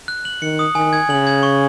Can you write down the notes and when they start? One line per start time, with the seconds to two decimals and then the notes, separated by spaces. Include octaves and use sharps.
0.08 F#6
0.25 F#7
0.42 D#3 C#7
0.59 D#6
0.75 D#3 G#5
0.93 G#6
1.10 C#3 F#7
1.27 G#6
1.43 C#6